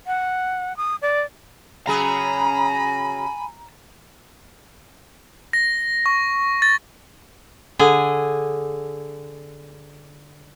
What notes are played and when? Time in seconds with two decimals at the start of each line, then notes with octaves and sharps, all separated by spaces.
0.07 F#5
0.77 D#6
1.02 D5
1.87 C#3 F#3 G#4 G#5 A#5 B5
5.53 A#6
6.06 C#6
6.62 A6
7.79 D3 G#4